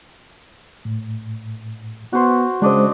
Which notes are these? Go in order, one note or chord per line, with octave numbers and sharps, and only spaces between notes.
A2
B3 F#4 C5
C#3 G#3 D4 C5 D5 D#5